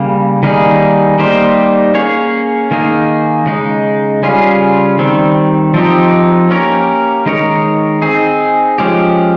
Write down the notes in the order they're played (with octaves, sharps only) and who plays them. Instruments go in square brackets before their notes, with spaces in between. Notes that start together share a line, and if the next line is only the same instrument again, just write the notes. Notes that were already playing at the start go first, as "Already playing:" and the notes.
Already playing: [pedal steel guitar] C#3 G3 A#3
D#3 G3 A#3 D#4 G#4
G3 A#3 D#4 G4 C5
A#3 C#4 G#4 C#5
D#3 A#3 D#4 G#4
C#3 G#3 D#4
C#3 G3 C#4 F4 G#4
D#3 G3 C4
F3 C4 D#4 G4
A#3 C#4 G4 A#4 C#5
D#3 G#3 D#4 A#4 C#5
C4 D#4 G#4
F3 G#3 C#4 G4